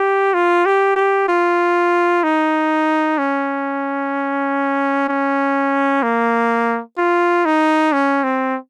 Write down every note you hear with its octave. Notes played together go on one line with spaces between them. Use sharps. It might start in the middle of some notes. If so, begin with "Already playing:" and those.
Already playing: G4
F4
G4
G4
F4
D#4
C#4
C#4
A#3
F4
D#4
C#4
C4